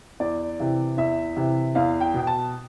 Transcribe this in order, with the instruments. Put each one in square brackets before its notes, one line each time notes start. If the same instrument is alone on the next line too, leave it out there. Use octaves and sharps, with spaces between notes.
[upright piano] E2 D5
C3 E3
E2 E5
C3 E3
E2 F5
G5
B2 G5
A5